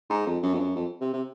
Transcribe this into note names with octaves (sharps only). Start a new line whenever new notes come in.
G#2
F2
F#2
F2
F#2
F2
C3
C3